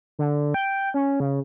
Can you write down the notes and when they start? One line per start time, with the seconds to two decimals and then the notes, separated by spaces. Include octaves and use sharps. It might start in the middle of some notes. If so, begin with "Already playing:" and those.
0.19 D3
0.54 G5
0.94 C#4
1.20 C#3